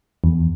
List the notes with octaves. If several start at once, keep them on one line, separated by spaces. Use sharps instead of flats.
E2